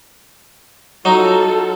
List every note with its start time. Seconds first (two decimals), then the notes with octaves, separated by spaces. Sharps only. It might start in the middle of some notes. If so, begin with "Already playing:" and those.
1.05 F#3 D#4 F4 A4